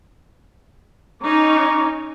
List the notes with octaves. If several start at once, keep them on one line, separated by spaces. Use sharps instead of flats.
C#4 D#4 A#5 C#6 D6